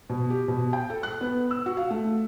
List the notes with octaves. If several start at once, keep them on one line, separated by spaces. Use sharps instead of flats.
B2
G4
B2
G5
A4
F#6
B3
E6
F#4
F5
A3